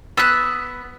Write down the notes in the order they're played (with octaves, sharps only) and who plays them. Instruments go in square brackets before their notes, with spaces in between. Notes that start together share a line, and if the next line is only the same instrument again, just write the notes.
[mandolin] B3 F#6 [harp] E6 B6